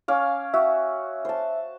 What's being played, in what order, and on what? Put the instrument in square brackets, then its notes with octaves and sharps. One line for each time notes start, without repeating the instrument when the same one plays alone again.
[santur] C#4 F5 D6
[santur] F#4 [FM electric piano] E5
[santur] C5 A5